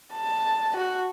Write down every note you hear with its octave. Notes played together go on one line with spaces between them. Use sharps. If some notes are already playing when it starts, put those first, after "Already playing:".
A5
F#4